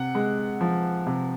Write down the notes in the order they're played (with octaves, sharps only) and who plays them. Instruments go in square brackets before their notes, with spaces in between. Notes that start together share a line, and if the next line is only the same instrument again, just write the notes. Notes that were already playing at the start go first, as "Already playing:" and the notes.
Already playing: [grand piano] C3 F#5
G#3
F3
C3